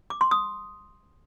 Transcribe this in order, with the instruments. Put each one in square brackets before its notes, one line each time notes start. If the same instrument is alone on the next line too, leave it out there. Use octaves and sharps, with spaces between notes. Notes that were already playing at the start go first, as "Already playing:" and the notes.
[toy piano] D6
C6
D#6